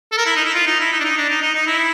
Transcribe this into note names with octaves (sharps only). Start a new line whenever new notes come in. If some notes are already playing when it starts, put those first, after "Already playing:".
A4
A#4
E4
D#4
E4
F4
D#4
E4
D#4
D4
D#4
D4
D#4
D#4
D#4
E4